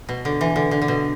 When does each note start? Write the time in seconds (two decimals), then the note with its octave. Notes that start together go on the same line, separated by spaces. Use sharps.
0.09 B2
0.25 D3
0.41 E3
0.56 D3
0.71 D3
0.82 D3
0.88 B2